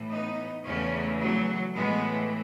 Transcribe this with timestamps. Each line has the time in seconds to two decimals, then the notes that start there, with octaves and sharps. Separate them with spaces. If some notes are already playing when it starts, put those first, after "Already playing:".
Already playing: A2 E3
0.11 B3 D#4
0.65 E2 C#3 E3 A3 C#4
1.20 F#3 A3
1.75 A2 E3 G#3 B3